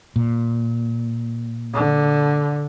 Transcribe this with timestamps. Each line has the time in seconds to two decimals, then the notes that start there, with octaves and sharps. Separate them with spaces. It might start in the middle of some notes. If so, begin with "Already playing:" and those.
0.16 A#2
1.74 D3